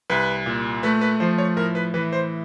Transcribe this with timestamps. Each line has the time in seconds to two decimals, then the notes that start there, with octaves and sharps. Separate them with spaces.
0.10 C2 B4
0.46 A#2
0.83 A3 B4
1.01 B4
1.20 F3 C5
1.38 C#5
1.56 A2 A#4
1.75 B4
1.94 E3 B4
2.13 C5